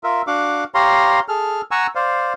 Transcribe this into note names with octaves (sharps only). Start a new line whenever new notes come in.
F4 A#4 E5
D4 F#4 F5 F#5 D6
G4 C#5 F5 A#5 C6
G#4 A4 F6
F#5 G#5 A#5 C#6 E6
C5 D5 F5